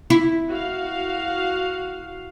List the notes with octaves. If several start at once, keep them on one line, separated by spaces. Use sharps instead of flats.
E4
F#4 F5